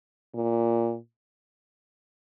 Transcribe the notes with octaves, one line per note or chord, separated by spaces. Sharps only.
A#2